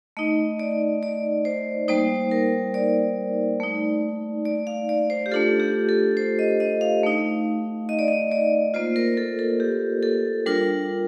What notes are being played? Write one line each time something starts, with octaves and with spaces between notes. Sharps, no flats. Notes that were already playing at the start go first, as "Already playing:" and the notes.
A3 D#4 D#5
D5
D5
C5
G3 A#3 D#4 C5
A#4
D5
A3 D#4
D5
F5
D5
C5
G4
A3 D4 F4 A4
G4
A4
C5
D#5
D#5
F5
A3 D#4
D#5
D5
D#5
D5
A#3 F4 C5
A#4
A4
A4
G4
A4
G3 D4 F4 A#4